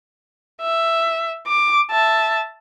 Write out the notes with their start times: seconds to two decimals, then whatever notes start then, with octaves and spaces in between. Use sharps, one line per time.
0.61 E5
1.47 D6
1.91 E5 A5